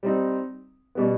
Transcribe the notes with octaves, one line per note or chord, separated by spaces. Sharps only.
G3 C4 D#4
B2 G3 B3